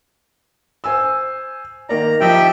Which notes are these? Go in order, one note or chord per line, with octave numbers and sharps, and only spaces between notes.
C5 G#5 E6
D#3 A#3 D5 A#5
F3 D#4 G4 E5 G5